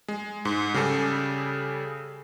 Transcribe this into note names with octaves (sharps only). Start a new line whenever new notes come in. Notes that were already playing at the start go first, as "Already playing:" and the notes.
G#3
G#2
C#3 G3 G#4 A4